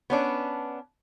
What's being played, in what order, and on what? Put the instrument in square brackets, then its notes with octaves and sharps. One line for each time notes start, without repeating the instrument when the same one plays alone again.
[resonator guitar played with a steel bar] B3 C#4 D4